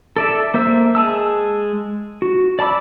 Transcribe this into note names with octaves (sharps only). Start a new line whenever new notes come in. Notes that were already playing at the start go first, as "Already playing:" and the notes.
A4 D5 E5
A#3 C5 E5 E6
G#3 G#4 A5 E6
F#4
D5 A5 B5 D6 E6